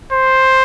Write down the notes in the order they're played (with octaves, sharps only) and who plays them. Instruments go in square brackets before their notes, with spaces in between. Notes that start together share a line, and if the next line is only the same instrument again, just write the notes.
[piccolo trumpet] C5